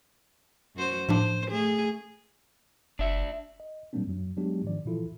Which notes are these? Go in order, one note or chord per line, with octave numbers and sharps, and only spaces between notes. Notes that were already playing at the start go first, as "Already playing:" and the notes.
F#2 F#4 C5
A2 F3 D4 C5
A3 G#4
F#1 D4 E5
D#5
A#2 F#3 G3 A#3 C4 D4
F#2 F#3
F#3 G#3 B3 D4 G4
G#2 D#3 F3 D5
A#2 E3 F3 E4 F4 A4